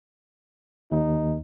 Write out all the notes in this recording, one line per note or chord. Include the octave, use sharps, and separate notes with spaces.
D#2 D#4